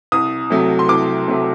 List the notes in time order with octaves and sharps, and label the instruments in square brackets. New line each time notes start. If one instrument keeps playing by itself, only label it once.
[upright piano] C2 D#6
C3 F#3 A3
C6
C2 D6
C3 F#3 A3